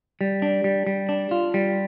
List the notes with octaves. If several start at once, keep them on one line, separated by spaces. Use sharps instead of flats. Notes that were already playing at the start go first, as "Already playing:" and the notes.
G3
D4
G3
G3
D4
F4
G3